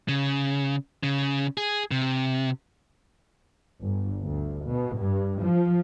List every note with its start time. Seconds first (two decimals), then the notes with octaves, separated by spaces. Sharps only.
0.09 C#3
1.03 C#3
1.58 G#4
1.91 C3
3.81 G1
4.25 D2
4.66 B2
5.00 G2
5.43 F3